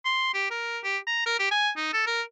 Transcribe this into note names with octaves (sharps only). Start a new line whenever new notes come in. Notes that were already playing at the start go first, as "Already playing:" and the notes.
C6
G4
A#4
G4
A#5
A#4
G4
G#5
D#4
A4
A#4